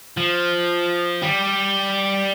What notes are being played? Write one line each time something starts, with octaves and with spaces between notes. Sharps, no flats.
F3
G3